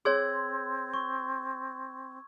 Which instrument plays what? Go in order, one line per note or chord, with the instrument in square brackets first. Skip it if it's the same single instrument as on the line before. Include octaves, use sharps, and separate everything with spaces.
[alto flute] C4 [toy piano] G#4 C#5 [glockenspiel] C6 E6 G#6
[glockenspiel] C#6